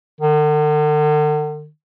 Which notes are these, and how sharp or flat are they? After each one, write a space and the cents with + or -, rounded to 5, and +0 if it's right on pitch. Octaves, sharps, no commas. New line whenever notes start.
D3 +45